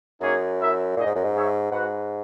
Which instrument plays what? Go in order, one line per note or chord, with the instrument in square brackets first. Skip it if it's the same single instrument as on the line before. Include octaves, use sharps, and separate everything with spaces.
[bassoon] F#2 [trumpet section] A#3 D#4 G#4 C#5
[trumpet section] E4 A#4 E5
[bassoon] A#2 [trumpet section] D#4 G#4 D#5
[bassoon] G#2
F#2
G#2
[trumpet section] D#4 G#4 C#5 E5
[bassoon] G#2 [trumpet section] F#4 B4 F#5